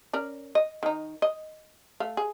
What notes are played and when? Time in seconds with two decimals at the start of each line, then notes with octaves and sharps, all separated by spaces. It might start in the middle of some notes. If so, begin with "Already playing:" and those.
0.13 C#4 A#4 D5
0.55 D#5
0.83 D#3 D#4
1.22 D#5
2.00 A3 F5
2.17 G#4